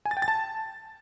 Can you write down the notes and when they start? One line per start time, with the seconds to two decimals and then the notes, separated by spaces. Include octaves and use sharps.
0.05 G#5
0.11 A6
0.17 G5
0.22 A6
0.28 A5